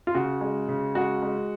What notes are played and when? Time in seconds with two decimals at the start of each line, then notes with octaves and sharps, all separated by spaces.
0.07 F4
0.15 C#3 F#4
0.41 G#3
0.69 C#3
0.95 G#3 F#4
1.22 G#3